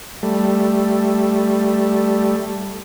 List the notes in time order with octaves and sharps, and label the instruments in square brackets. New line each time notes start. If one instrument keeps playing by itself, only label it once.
[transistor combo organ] G3 A3